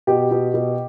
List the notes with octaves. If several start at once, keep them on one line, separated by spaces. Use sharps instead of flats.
B2 G4
B2
B2